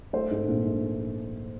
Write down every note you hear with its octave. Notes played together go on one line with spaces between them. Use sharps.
A3 C5
G#2
A#1
G#2